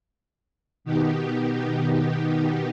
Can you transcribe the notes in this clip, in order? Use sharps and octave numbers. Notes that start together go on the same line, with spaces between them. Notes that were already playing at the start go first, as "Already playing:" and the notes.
B2 D#3 B3 D#4 G4